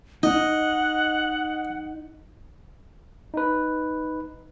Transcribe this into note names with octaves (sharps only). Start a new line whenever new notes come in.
D#4 D#5 F#5
D#4 B4